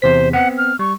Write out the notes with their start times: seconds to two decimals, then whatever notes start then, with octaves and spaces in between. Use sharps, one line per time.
0.02 E2 C3 C5 B6
0.33 B3 C4 F#5
0.58 F6
0.79 G3 C#6